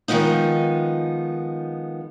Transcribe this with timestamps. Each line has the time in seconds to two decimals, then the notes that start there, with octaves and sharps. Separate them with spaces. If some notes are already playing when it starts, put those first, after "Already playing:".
0.08 D#3 F3 G#3 B3 D#4